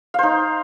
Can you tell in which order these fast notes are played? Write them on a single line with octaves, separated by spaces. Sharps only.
F5 C5 D#4